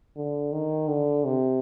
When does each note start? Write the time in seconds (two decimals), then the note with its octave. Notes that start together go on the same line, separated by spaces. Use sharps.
0.16 D3
0.52 D#3
0.88 D3
1.25 C3